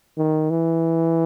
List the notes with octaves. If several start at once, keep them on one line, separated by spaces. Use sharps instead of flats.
D#3
E3